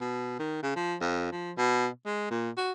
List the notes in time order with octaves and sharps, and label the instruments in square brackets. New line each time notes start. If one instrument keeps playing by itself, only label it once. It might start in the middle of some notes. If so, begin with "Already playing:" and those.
[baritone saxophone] B2
D#3
C#3
F3
F2
F3
B2
G#3
A#2
F#4